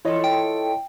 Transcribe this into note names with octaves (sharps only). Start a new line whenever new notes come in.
E3 E4 F4 A4 C#5 D#5
G5